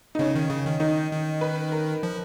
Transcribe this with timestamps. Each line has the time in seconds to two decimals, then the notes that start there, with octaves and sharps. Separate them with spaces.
0.15 D#4
0.19 C#3 C#4
0.35 D#3
0.50 C#3
0.66 D#3
0.80 D#3 D#4
1.11 D#3
1.41 B4
1.72 A#4
2.03 F3